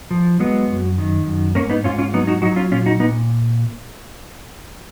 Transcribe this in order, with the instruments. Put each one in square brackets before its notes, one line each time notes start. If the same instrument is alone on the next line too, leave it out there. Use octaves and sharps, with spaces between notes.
[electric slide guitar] F3
F#3 G#3 B3
F#2
D#3
F#2
G#2 A#3 C#4
B3 D#4
G#2 C#4 F4
C#4 F4
F#3 B3 D#4
D#4 F#4
F#3 D#4 F#4
C#4 F4
A#2 C#4 F4
D#4 F#4
A#2 B3 D#4